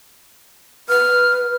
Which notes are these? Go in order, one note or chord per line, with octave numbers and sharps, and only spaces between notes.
B4 F6